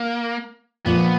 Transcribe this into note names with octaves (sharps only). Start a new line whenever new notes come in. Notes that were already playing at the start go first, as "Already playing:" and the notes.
Already playing: A#3
A#2 F3 A#3 B3